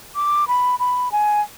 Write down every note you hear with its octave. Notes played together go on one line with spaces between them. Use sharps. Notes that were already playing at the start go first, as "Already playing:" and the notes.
D6
B5
B5
G#5